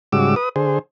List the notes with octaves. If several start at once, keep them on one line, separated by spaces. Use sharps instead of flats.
G#2 C#3 G3 F#4 D6 E6
B4 D#6
D3 G#4 C5